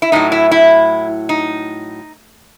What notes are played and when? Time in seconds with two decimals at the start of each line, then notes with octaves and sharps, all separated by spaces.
0.02 E4
0.12 A2 F#3 D#4
0.32 E4
0.51 E4
1.29 D#4